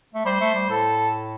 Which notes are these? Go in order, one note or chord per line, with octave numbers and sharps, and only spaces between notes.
A3
G3 C5
A3
G3
A2 A4